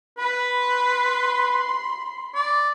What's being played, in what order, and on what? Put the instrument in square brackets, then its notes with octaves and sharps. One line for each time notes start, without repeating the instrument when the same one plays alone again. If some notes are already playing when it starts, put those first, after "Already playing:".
[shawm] B4 [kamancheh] B5
[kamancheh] B5 C6
[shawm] D5